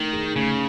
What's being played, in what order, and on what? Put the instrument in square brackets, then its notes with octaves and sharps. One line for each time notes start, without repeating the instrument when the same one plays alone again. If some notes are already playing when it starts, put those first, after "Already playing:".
Already playing: [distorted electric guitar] D#3 [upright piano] A3 D#4
[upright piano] G#4
[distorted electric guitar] C#3 [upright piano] A3